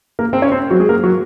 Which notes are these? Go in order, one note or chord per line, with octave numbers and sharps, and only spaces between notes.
A#3 A#4
C4 C5
C#4 C#5
C4 C5
F#3 F#4
G#3 G#4
A#3 A#4
F#3 F#4